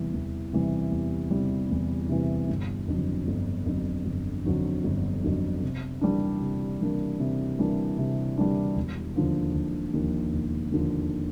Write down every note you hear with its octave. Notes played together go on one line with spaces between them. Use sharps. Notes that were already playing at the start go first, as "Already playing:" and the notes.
Already playing: E2 C3 E3 G3
E2
C3 E3 G3
E2
C3 E3 G3
E2
C3 E3 G3
G1
F2 D3 F#3
G1
F2 D3 F#3
G1
F2 D3 F#3
G1
F2 D3 F#3
C3
E3 G3 A#3 D4
C3
E3 G3 A#3 D4
C3
E3 G3 A#3 D4
C3
E3 G3 A#3 D4
E1
D#2 D3 F3
E1
D#2 D3 F3
E1
D#2 D3 F3